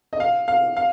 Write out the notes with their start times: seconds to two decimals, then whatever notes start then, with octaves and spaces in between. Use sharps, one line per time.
0.13 D#5
0.20 F5
0.48 F5
0.77 F5